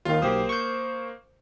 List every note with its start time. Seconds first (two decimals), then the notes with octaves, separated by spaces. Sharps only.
0.05 D#2 D#3 F4 F5
0.22 B1 A#3 G4 C5 D#6
0.49 C#6 G6